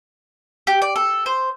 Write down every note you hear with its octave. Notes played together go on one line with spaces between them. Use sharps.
G4
D5
A4
C5